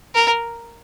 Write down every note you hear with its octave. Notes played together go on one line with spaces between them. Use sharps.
A#4